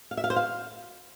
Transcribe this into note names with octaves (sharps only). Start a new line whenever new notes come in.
F5
E5
F5
C5
F5